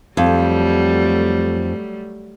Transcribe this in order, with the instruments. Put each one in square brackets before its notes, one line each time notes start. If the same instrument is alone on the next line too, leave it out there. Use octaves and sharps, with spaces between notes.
[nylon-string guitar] F2 [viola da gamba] F#3 G3 A3